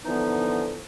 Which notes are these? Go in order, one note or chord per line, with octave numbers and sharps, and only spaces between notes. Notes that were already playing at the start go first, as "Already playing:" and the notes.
D3 E3 F3 B3 D#4